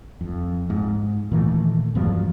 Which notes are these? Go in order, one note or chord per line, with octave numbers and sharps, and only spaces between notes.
F2
G#2
A#2 D#3 E3 A3
E2 G2 F3 F#3